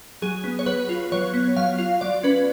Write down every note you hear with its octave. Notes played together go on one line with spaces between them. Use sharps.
F#3 G#4
B3
C#5
F#3 B4
F4
F#3 C#5
B3
F#3 F5
F4
F#3 D5
C#4 B4